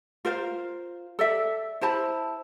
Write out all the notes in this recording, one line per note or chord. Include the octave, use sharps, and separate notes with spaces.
F4 A#4 C5 F5
A4 D5 E5
E4 C5 A5 B5